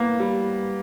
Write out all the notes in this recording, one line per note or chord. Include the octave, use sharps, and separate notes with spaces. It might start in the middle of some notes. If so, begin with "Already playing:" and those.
Already playing: A#3 B3
G3